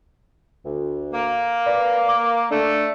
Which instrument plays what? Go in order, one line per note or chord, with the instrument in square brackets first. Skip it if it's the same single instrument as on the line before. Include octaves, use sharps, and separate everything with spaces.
[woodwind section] D2
[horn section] A#3
[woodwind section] B4 D5
D6
[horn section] A3 [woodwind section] D4